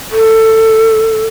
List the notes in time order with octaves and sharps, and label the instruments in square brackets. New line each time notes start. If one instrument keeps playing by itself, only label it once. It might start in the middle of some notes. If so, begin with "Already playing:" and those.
[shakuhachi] A4